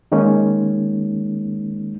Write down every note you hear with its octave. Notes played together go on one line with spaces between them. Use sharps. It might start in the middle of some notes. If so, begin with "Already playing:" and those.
D#3 G#3 A#3 C#4 D#4